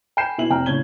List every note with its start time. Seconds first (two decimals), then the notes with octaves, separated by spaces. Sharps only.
0.17 G5 G#5 B5 G6 C7 E7
0.38 B2 E4 E5 F#7
0.50 F1 C3 G5 A#5 F6
0.66 A2 C#3 C#5 G#6 G7